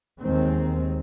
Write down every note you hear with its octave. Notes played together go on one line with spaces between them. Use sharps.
D#2 D#3 G#3 C4